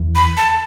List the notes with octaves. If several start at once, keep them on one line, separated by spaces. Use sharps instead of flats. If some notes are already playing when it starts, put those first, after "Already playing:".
Already playing: E2
B5
A5